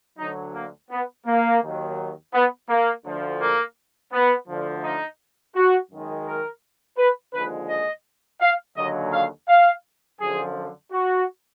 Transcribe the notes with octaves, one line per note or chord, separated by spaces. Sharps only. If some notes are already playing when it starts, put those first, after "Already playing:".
D2 D3 F#3 D#4
A#3
B3
A#3
D#2 D#3 F#3
B3
A#3
D2 D3 F3
A#3
B3
D2 D3 F3
D#4
F#4
F#2 D#3 G#3
A#4
B4
D#2 D3 F3 G#3 B4
D#5
F5
D#2 D3 F#3 D#5
F5
F5
F#2 D3 F3 G#4
F#4